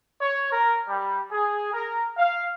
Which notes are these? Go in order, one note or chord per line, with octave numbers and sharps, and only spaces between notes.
C#5
A#4
G3
G#4
A#4
F5